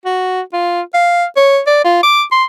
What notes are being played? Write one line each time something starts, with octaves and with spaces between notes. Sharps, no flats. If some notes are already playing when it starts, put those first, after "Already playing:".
F#4
F4
F5
C#5
D5
F4
D6
C6